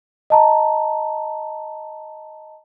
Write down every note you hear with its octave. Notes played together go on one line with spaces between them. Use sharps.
D#5 A5 A#5